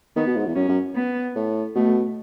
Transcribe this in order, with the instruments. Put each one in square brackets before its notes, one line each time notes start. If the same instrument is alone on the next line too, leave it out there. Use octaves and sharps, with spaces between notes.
[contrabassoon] D#3 [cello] B3
[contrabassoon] B2
G#2
E2
[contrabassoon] F#2 [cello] C#4
[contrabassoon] F#2
[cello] B3
[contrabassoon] A2
[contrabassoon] B2 [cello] A3